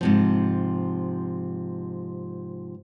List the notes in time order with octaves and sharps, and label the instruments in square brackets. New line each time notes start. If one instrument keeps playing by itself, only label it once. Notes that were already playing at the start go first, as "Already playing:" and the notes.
[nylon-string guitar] G#2 C3 F3